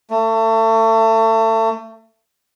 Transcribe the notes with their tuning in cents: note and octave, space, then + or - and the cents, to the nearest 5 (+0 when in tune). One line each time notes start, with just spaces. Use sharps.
A3 +30